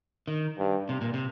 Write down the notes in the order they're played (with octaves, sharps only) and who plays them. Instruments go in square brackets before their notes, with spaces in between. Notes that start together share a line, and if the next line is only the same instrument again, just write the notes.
[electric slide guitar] D#3
[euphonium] G2
[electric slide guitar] C3
A#2
C3